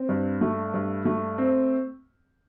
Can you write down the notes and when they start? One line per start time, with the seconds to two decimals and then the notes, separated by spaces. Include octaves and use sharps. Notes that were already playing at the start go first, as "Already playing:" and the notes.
Already playing: C4
0.09 G2
0.41 A3
0.74 G2
1.05 A3
1.38 C4